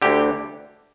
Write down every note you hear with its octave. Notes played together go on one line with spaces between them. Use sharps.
D2 D3 G4